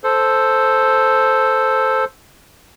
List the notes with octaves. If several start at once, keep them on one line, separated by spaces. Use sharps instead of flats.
A4 C5